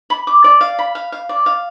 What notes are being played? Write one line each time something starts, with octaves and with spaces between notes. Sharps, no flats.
B5
D6
D5
F5
B5
F5
F5
D5
F5